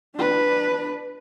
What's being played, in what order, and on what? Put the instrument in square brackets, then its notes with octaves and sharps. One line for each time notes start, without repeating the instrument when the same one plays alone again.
[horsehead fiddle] D4 B4